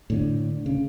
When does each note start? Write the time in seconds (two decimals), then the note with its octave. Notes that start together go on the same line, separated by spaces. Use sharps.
0.10 A2 D3
0.66 C#3